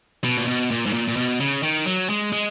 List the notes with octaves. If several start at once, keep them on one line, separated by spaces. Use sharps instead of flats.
B2
A#2
B2
A#2
G#2
A#2
A#2
B2
C#3
D#3
F#3
G#3
G#3